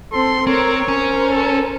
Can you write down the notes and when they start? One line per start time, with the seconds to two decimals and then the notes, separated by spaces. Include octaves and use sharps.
0.13 C4 A4 C6
0.47 C4 A#4 C#5
0.88 C#4 A#4 C5
1.30 A4